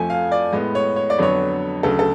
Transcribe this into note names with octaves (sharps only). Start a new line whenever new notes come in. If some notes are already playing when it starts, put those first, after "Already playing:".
Already playing: F2 F3 A3 G#5
F5
D5
A2 G#3 B3
C#5
C#5
D5
F2 D3 F#3 B3 C#5
D2 C#3 F#3 A4
A4